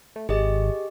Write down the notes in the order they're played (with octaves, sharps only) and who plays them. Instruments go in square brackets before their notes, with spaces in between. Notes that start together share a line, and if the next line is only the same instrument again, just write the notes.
[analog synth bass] A3
[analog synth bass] G#1 [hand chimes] G4 G#4 D#5